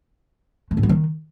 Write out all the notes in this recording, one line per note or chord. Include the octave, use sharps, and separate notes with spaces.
A3
A2
F#3
D#3